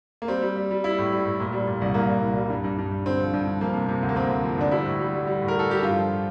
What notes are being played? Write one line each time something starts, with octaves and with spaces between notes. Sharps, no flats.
A#3
G3 C4
G3
G3
G3
G3 E4
A2
G3
A2
A#2
G3
A#2
C2
C2 A#3
C2
C2
G3
G2
G2
G2
G2
D3 C4
F3
G2
G2
F3 A#3
C3
C3
D2
A#3
D2 C4
D2
F3
D2 D4
G3 E4
A2
G3
G3
G3
A2
A#4
A2 A4
G3 G4
G2 F4
F3